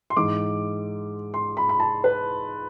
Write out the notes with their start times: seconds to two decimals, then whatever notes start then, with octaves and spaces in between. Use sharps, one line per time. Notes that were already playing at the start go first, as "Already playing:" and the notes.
0.10 C6
0.17 G#2 E3 D6
1.34 C6
1.57 B5
1.69 B5
1.80 A5
2.04 B4